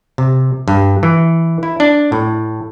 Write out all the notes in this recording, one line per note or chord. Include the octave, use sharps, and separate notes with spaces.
C3
G2
E3
E4
D4
A2